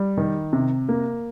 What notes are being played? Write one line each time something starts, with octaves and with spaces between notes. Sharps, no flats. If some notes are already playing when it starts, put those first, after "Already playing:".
Already playing: G3
D#3
C3
A#3